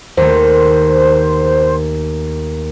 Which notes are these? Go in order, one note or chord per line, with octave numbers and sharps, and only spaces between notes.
D#2 A3 C5